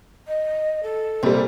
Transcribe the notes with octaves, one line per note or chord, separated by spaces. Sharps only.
D#5
A4
C2 A#2 G3